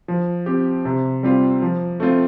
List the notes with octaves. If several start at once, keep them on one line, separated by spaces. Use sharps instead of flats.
F3
C4 G4
C3
G3 C4 F4
F3
A3 C4 F4